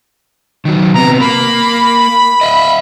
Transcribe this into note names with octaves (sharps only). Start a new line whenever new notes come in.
D#3 F#3
C3 B3 A#5
A#3 B5
D#5 E5